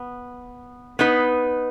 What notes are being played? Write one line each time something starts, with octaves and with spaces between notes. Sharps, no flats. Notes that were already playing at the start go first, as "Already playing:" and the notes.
Already playing: B3
B3 D#4 B4